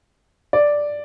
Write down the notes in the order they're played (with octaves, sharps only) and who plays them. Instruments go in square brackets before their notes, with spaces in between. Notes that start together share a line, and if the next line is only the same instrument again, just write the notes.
[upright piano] D5